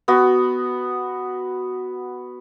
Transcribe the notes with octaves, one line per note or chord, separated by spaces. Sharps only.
B3 F#4